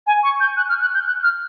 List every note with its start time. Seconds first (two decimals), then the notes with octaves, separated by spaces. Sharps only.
0.07 G#5
0.23 C#6
0.40 G6
0.57 F#6
0.69 F6
0.81 F#6
0.95 G6
1.07 F#6
1.23 F6